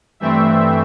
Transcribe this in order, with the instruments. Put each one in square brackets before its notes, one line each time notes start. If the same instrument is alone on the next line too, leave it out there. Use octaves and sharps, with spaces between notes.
[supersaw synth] G2 E3 A3 C4 E5